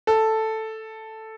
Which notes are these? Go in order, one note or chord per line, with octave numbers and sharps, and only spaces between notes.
A4